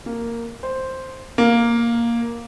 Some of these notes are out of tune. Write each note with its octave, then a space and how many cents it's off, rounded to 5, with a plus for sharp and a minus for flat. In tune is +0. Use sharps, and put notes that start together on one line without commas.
A#3 -5
C5 +0
A#3 +5